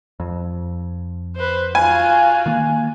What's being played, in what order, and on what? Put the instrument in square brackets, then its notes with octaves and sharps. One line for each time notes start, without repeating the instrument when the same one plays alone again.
[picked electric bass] F2
[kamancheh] B4 C5
[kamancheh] F4 F#4 [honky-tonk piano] G#5
[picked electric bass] D#3 A#3